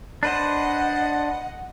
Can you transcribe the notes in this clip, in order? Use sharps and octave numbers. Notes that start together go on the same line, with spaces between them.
D4 B4 C5 D#5 F#5